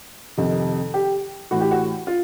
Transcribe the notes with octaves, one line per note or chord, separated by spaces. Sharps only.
F2 C3 D#3
G4
A2 E3 F#4
G4
F#4
F4